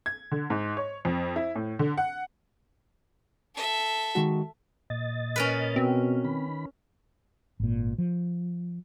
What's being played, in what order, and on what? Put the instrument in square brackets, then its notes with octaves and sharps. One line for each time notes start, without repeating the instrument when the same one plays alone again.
[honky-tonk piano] G#6
D3
G#2
C#5
F2
E4
A2
D3
F#5
[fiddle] A4 E5
[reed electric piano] D#3 G#3 F#4
[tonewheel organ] A#2 D#5 A6
[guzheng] C#4 A#4 B4
[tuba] B2 [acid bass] C4
[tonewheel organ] D#3 B5
[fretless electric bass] G#1 A#2
F3